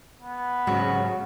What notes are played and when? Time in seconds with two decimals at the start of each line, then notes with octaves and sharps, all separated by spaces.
0.22 B3
0.67 G#2 C#3 F#3 F#4